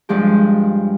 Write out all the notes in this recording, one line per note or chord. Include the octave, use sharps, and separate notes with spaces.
G2 F3 G#3 G4